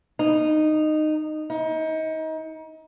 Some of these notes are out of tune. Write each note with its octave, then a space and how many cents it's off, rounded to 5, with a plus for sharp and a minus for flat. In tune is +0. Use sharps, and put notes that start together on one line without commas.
D#4 -15
D#4 +30